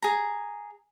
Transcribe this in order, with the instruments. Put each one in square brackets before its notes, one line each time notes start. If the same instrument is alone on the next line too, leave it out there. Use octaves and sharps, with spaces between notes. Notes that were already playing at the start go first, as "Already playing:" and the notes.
[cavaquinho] G#4 A#5